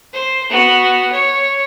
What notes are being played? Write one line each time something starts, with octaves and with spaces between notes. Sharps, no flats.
C5
B3 F#4
C#5